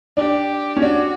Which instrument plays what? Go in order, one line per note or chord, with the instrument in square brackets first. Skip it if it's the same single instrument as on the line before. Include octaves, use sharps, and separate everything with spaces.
[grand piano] D4 [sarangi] G4
[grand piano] C#4
[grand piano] D4 [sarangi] F#4